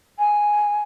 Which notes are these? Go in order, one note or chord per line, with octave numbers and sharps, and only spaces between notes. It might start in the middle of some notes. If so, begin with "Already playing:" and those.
G#5